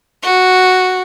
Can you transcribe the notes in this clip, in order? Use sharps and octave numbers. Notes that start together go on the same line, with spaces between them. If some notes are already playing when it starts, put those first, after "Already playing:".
F#4